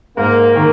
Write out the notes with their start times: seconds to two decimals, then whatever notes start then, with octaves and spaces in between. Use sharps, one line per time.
0.17 G#2 A#3
0.56 D#3